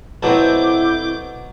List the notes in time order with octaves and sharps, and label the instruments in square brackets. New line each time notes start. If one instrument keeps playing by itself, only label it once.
[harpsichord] B2 F#3 B3 [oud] C4 A4 [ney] E4 [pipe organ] D6 G6